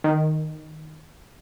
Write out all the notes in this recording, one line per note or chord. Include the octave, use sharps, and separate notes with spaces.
D#3